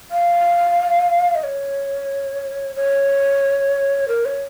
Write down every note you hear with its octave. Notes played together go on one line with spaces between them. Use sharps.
F5
D#5
C#5
C#5
A#4
C#5